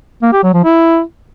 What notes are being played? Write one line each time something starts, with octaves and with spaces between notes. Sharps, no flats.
A#3
G4
F#3
F3
E4